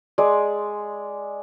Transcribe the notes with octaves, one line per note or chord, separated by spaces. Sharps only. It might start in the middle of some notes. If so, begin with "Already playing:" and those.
G#3 D5